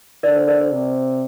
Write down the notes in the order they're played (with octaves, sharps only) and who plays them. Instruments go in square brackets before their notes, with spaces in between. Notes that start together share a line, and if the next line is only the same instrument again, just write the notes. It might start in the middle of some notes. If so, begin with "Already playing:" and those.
[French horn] D3 [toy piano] A#4 D5
[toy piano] C5
A#4 D5
C5
[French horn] C3